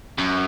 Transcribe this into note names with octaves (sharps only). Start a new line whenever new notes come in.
F#2